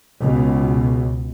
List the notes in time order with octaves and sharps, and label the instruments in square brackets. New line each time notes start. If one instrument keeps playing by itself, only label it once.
[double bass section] C#2 B2